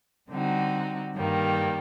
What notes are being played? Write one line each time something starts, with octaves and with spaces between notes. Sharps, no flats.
D3 G3 C4 D#4 F#4
G2 D#3 G3 A#3